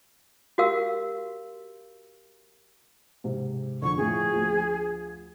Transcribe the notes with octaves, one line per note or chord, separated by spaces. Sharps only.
F#4 G4 A#4 F5 E6
G#2 C3
F2 D3 C#6
A2 F3 C4 G#4
D2 F3